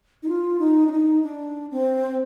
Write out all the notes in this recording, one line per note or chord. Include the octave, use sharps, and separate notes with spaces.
D#4
F4
D#4
D4
D#4
D4
C4